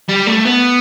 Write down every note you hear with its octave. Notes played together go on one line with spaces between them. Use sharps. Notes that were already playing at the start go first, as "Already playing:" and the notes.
G3
A3
B3